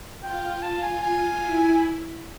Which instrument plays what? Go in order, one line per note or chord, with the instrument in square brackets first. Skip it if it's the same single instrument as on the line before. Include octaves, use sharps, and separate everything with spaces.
[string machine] F4 [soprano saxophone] G5
[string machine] F4 [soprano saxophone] A5
[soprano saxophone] G#5
G#5
[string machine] E4